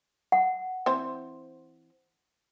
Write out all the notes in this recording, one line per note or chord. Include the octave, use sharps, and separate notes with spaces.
F#5
E3 C4 C5